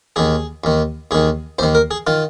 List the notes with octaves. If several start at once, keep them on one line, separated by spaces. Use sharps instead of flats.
D#2 D#3 G#4
D#2 D#3
D#2 D#3 G#4
D#2 D#3 C5
A#4
G#4
D#3 F4